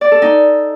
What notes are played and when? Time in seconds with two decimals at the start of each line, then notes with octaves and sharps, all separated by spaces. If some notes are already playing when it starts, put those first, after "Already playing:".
0.01 D5
0.12 A4
0.22 D#4